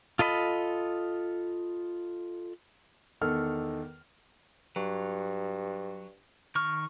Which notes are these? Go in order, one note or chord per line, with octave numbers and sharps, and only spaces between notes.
F4 A4 D#5 B5
E2 D#3 A4 F6
G2 F#3
D#3 C#6 F6